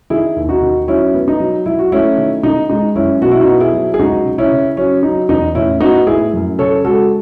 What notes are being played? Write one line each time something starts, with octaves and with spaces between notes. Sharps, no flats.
D#3 E4 G#4
D#2
D#4 F#4
D#3
F#3 C#4 E4
B3
D#4
F#3
F#3 E4
F#4
A3 C#4 E4
D#3
D#3 D#4
G#3 D#4
F#2 C#4 E4
B2 F#4
E4
D#4 F#4
B3
E4 G#4
F#3
G#4
C#2 D#4 F#4
C#3
C#4 E4
C#3
F#3 C#4
F#3 D#4
E2 D#4
A2 C#4 E4
B3 D#4 F#4
A2 E4 G#4
F#2
C#3 A4 C#5
G#3 F#4 A4